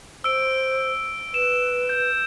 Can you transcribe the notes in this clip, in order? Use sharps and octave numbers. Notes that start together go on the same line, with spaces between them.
C5 E6 D7
B4 E7
G6